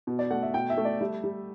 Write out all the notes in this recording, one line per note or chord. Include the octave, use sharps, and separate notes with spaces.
B2
D5
A3 F#5
E5
B2 G5
E5
A3
D5
G3 E5
G3